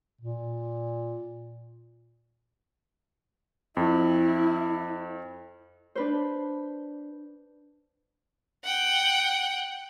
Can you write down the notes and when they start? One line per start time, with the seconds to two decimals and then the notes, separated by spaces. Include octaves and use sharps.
0.21 A#2
3.77 F2 E4
5.95 D4 B4 C5
8.64 F#5 G5